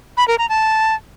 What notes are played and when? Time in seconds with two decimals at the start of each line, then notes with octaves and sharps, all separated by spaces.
0.17 B5
0.28 A#4
0.38 A#5
0.49 A5